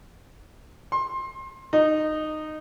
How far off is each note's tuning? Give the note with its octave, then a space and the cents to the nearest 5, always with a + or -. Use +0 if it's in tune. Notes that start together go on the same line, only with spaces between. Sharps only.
C6 +25
D#4 -15